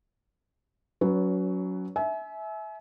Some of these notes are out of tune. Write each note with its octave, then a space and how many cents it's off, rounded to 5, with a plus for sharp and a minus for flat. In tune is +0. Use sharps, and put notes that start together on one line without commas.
F#3 +0 C#4 +25 B4 +0
E5 -15 G#5 +40